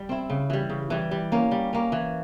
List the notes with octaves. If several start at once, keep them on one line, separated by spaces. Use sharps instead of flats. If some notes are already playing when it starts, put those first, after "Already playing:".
Already playing: G3
C4 E4
C#3
E3 G3
C#3
E3 G3
G3
A#3 C#4
G3
A#3 C#4
E3